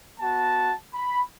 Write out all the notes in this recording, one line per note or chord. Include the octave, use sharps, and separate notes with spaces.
B3 F#4 A5
B5